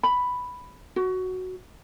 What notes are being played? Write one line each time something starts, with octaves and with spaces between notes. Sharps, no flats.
B5
F#4